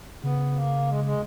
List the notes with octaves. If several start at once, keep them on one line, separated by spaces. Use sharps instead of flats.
C#3 B3
A#3
G#3
G#3